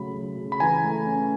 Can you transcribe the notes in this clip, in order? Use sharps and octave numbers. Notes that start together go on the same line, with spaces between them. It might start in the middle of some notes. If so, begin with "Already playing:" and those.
Already playing: C#3 F#3 A3 B5
F#3
C#3
B5
E3 G#5 A#5
A3
C#4